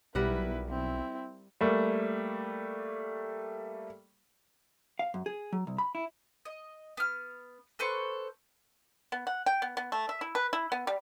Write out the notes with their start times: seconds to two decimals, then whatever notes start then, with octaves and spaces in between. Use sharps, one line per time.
0.15 B1 G3 E4 A#4 B4 F#5
0.69 C4 E4
1.61 G3 A3 A#3
4.99 F5
5.14 F#2
5.26 G#4
5.52 F#3
5.67 C2
5.78 B5
5.95 E4
6.45 D#5
6.97 B3 F6
7.79 A4 B4 C5 C#6
9.12 B3
9.27 F#5
9.46 G5
9.62 B3
9.77 B3
9.92 A3
10.09 E5
10.21 E4
10.35 B4
10.53 E4
10.72 B3
10.87 G3